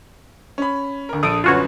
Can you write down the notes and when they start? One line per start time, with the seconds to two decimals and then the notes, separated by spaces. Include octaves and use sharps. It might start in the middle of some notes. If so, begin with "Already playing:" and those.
0.58 C#4 B5
1.09 D2 A#4
1.23 A#1 A4 D#6 E6 D7
1.44 G1 F#2 F4 F#4 B4 C#5